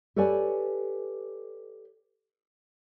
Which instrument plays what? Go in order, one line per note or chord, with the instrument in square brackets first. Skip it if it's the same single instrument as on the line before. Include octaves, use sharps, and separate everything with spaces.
[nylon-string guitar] G4 A4 B4 C#5 D5 G#5